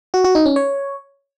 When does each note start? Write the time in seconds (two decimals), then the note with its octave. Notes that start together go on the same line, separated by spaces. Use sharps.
0.14 F#4
0.24 F#4
0.35 D#4
0.46 C#4
0.56 C#5